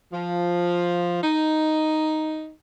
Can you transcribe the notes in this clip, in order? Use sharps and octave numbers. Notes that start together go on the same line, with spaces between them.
F3
D#4